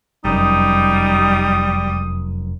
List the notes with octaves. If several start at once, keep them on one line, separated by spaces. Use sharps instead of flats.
F1 F#2 G3 D#4 D#6